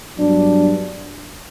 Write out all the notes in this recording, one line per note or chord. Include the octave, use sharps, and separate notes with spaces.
G2 F#3 B3 D4